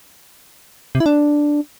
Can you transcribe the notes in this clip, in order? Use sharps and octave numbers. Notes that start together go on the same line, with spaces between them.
C3
E4
D4